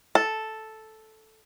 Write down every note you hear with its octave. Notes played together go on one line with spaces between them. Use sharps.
A4